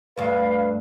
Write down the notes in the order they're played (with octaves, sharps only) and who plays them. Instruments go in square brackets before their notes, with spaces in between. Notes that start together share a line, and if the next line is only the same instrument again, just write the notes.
[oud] D2 G2 [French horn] B4 [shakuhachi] F5